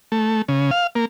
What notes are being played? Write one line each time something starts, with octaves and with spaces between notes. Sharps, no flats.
A3
C#3
F5
A#3